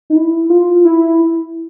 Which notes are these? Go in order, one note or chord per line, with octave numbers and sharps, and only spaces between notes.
D#4
E4
F4
E4